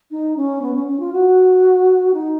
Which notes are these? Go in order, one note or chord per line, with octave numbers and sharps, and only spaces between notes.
D#4
C#4
B3
C#4
C#4
F4
F#4
D#4